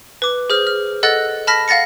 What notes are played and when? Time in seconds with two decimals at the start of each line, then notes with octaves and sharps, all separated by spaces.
0.22 B4 D6
0.50 G#4 C5 F6
0.67 F6
1.03 A4 D#5 F#5 F#6 A6
1.47 A5 B5 F6 A#6 B6
1.68 F5 F#5 A6 A#6 C#7